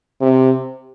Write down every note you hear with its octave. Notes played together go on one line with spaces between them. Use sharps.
C3